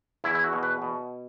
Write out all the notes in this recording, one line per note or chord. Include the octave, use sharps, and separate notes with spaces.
E2 E4
E4
F#4
B2
B4
B2